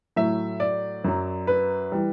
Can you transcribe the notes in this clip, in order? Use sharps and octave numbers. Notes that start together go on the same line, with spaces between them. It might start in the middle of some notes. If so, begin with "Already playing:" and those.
A2 F#3 E5
D5
F#2 F#3
B4
E3 G3